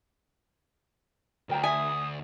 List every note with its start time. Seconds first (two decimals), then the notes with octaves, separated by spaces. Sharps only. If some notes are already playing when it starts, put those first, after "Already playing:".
1.49 D2 A#4 G5 A#5
1.64 E5 G#5 D#6